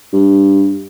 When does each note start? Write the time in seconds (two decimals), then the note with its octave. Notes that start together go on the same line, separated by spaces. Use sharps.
0.13 G2